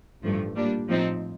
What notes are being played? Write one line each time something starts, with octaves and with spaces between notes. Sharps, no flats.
A1 G2 F3 A3
A#2 G3 D4
A2 F3 C4 D#4